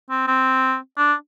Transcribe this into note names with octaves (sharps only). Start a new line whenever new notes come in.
C4
C4
D4